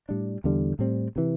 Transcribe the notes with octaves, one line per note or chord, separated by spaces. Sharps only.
A2 G3 D4
E2 D3 G3
A2 G3 C4
C3 E3